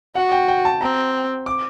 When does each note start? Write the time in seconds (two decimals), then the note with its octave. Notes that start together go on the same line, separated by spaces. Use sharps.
0.15 F#4 F#5
0.32 G5
0.48 G5
0.65 A5
0.81 C4 A#5
1.46 D6